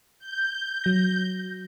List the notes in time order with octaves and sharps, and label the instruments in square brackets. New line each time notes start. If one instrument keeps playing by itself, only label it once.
[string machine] G6
[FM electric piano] F#3 A#6